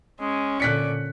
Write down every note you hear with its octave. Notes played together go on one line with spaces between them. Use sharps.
G#3 C#4
A#2 D3 D5 F#6 B6 C#7